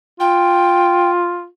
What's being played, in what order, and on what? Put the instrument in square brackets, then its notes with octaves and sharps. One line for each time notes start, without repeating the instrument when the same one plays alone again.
[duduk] F4 [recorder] G5